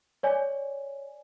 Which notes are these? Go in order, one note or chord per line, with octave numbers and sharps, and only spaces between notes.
C#5 D5 G#5